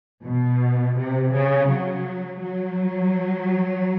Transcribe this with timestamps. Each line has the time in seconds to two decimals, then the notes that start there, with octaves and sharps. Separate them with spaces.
0.24 B2
0.97 C3
1.32 C#3
1.69 F#3
2.41 F#3